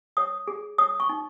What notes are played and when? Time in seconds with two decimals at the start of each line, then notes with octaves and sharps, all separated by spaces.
0.17 C#5 D#6
0.48 G#4
0.78 C#5 D#6
1.00 C#6
1.09 D#4